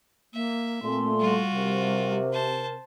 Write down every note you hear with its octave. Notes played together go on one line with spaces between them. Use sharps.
A#3 E5
A#2 A3 C4 C6
G3 F4 F#4
C3 A#4
C5 A5